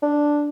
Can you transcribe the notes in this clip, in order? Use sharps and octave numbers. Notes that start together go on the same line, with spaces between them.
D4